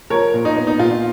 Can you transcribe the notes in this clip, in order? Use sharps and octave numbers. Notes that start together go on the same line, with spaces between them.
F3 A#4 C#5
A#2
D#4
B3
D#4
A#2 F4